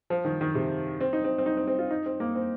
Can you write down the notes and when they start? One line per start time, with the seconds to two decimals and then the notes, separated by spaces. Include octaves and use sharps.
0.10 F3
0.25 D#3
0.41 D#3
0.55 C3
1.01 C4
1.13 D#4
1.24 C4
1.38 C4
1.46 D#4
1.57 C4
1.67 C4
1.79 F4
1.91 D#4
2.06 C4
2.20 A#3
2.35 C4